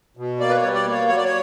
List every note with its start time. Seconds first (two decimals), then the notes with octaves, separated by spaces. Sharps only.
0.17 B2
0.40 A#3 D5
0.49 B4
0.57 C#5
0.63 G3
0.74 D5
0.86 A#3
0.91 C#5
1.08 F#3 C#5
1.17 D5
1.24 C#5